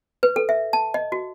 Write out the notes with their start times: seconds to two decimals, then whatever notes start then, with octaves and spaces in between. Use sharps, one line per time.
0.23 B4
0.36 A4
0.49 E5
0.73 A5
0.94 D#5
1.12 F#4